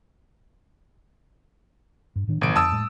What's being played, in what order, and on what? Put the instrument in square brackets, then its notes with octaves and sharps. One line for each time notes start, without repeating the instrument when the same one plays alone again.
[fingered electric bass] G2
A2 D#3 D4
[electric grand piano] G1 D7 [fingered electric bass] A#2 C#3 E3
[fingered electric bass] F2 [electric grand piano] A5 D#6 E6
[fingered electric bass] A2 G#3